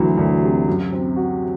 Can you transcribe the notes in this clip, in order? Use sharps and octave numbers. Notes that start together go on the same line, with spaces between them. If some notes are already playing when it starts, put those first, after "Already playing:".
Already playing: D2 E3 F#3
D2
C3
F#2
C4
F#4